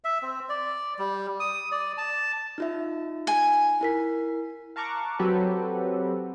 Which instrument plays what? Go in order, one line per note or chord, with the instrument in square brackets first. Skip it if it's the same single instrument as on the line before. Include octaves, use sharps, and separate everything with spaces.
[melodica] E5
C4
D5
G3
D#6
D5
A5
[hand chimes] D#4 F4 E5
[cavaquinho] G#5
[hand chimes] E4 A#4 B6
[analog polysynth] F5 A5 A#5 C#6 D6 F#6
F#3 C4 F#4 G4 A4 B4